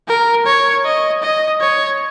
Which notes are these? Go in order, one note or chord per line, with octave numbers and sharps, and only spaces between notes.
A#4
C#5
D#5
D#5
C#5